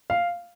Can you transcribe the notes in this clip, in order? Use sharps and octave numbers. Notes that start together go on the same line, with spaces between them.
F5